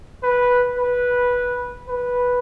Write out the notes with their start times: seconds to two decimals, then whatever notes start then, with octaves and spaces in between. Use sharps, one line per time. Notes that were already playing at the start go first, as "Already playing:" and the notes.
0.23 B4
0.78 B4
1.89 B4